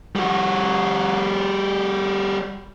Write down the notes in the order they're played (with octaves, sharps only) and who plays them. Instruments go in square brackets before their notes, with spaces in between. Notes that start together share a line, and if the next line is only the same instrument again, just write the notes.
[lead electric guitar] G3 F#4